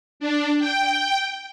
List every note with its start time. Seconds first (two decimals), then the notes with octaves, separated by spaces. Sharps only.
0.20 D4
0.59 G5